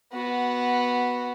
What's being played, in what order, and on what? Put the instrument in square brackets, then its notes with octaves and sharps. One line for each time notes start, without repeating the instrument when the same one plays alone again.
[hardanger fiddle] B3 F#4